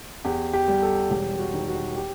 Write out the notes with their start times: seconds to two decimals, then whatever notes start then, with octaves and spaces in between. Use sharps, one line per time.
0.25 E2 G4
0.53 G4
0.68 G3
0.82 A4
1.10 E1 G4
1.39 F#4
1.53 D#3
1.68 F#4
1.96 G4